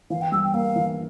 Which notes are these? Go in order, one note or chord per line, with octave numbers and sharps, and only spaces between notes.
E3 F5
G5
G3 E6
G5
A#3 F5
E3